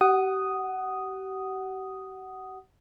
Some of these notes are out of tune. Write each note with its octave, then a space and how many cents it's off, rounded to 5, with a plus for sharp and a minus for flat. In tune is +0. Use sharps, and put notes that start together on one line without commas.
G4 -40 F#5 +15 D#6 +0